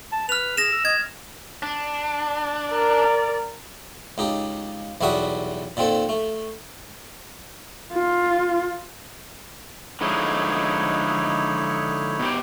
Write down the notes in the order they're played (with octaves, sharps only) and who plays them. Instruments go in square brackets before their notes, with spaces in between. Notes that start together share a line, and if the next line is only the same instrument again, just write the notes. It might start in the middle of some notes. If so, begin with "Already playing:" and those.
[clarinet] A5
[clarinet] B4 [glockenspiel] F6 F7
[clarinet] G#4 [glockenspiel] A#6 E7
[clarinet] E6
[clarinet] D#5 [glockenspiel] G#6
[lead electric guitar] D4
[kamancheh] A#4 D5
[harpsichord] C#2 D#4 G4
B1 E2 G3 F#4 E5 D#6
A#2 D#3 C4 A4
A3
[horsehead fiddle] F4
[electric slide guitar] D3 F3 G#3 [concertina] D#4 E4 C#5
[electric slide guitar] B2 G4